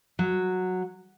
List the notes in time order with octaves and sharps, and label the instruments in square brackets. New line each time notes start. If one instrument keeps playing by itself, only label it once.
[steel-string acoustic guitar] F#3